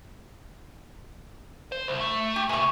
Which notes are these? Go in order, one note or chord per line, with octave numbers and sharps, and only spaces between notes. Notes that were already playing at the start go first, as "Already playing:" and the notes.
C5
C2
A3
G4
A2 C3 G#5 C#6